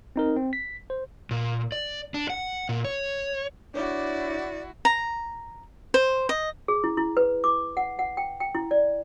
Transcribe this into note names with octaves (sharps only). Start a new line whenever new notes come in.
C4 D#4 A#4
C4
B6
C5
A#2
D5
D4
F#5
A#2
C#5
D4 E4 F#4 C#5 D5 D6
A#5
C5
D#5
G#4
E4
E4
B4
D6
F#5
F#5
G5
G5
E4
D5